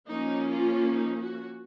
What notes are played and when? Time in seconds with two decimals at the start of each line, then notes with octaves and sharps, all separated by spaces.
0.10 F3 A#3 C#4 D#4
0.52 F4
0.95 D#4
1.23 F#4